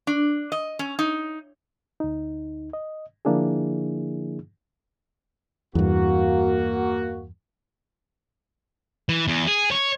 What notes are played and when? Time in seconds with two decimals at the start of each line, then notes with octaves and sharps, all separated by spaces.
0.07 D4
0.52 D#5
0.79 C#4
0.99 D#4
2.00 D2 D#4
2.73 D#5
3.25 D3 F3 A#3 D4 E4 G#4
5.75 E2 G2 A#3 F#4
9.09 E3
9.28 E2
9.48 G#4
9.71 C#5